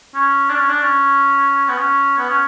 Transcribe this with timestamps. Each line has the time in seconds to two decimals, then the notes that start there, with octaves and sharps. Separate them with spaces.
0.14 C#4
0.49 D4
0.55 C#4
0.69 D4
0.82 C#4
1.69 B3
1.77 C#4
2.18 B3
2.30 C#4